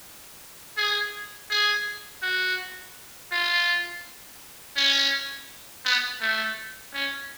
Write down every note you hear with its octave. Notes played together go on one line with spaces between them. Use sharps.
G#4
G#4
F#4
F4
C#4
B3
A3
C#4